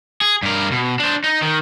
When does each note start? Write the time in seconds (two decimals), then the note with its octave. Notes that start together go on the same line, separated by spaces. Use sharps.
0.21 G#4
0.43 G2 A#4
0.72 B2
1.00 D4 C5
1.24 D#4
1.42 D#3